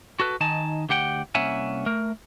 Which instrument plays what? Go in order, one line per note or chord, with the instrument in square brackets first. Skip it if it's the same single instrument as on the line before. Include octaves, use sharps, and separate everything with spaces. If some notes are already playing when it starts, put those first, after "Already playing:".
[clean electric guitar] F#4 A4 B4
D#3 D#4 G#5 A5
D2 G4 F#5 G5
C2 A#3 C#4 E5 F#5 G#5
A3 A#4